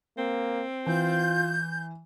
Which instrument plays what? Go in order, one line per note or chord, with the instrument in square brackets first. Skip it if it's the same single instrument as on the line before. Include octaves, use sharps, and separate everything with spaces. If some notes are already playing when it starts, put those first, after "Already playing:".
[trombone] A#3 [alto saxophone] C4
[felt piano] E3 [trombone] F4 [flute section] G6